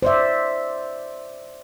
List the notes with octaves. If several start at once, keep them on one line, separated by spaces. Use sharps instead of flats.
C5 D5 E5